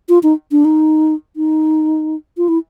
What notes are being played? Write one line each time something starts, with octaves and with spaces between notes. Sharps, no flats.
F4
D#4
D4
D#4
D#4
F4
E4